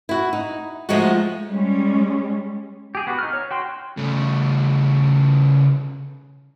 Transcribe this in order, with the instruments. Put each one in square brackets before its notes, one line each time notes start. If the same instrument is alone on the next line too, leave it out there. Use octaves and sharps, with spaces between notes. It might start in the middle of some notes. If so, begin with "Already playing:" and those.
[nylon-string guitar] E4 F#4
D#4
F3 G#3 A3 D#4 F#4
[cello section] G3 G#3 C#4
[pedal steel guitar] G4 G#4
B3 F#4
D#4 F6
C#5
F#4 G5 C6
[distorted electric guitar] C#3 A3